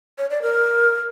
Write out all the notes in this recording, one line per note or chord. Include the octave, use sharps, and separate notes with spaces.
C#5
D5
A#4